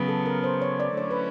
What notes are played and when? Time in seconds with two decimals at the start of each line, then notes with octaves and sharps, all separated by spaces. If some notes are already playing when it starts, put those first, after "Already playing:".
Already playing: C#3 F#3 B3
0.08 A4
0.26 A#4
0.44 C5
0.62 C#5
0.80 D5
0.97 D3 F#3 A3 C#4 E4 C#5
1.11 B4